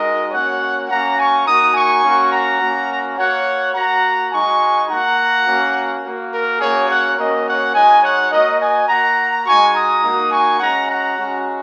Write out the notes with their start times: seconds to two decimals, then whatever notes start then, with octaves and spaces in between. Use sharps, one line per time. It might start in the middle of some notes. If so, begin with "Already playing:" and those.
Already playing: G#3 D#4 F#4 A#4 D#5
0.31 A#3 C#4 F#4 C#5 F#5
0.88 A#3 C#4 F#4 F#5 A#5
1.17 G#5 C#6
1.46 A#3 D#4 F#4 A#5 D#6
1.74 G#5 C#6
2.03 A#3 C#4 F#4
2.31 F#5 A#5
2.60 A#3 C#4 F#4
3.17 A#3 F#4 C#5 F#5
3.74 A#3 F#4 F#5 A#5
4.31 G#3 D#4 F#4 G#5 C#6
4.88 A#3 F#4 F#5 A#5
5.46 A#3 C#4 F#4
6.03 A#3 F#4
6.31 A#4
6.60 A#3 C#4 F#4 G#4 C#5
6.89 C#5 F#5
7.17 A#3 C#4 F#4 A#4 D#5
7.45 C#5 F#5
7.74 G#3 D#4 F#4 D#5 G#5
8.03 C#5 F#5
8.31 A#3 F#4 A#4 D#5
8.60 D#5 G#5
8.88 A#3 F#4 F#5 A#5
9.45 G#3 D#4 F#4 G#5 C#6
9.74 A#5 D#6
10.03 A#3 D#4 F#4
10.31 G#5 C#6
10.60 G#3 C#4 F#4 F#5 A#5
10.88 F#5 A#5
11.17 G#3 C#4 F#4